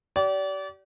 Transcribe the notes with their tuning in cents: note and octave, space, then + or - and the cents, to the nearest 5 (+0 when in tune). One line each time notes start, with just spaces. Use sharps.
G4 -40 D5 -30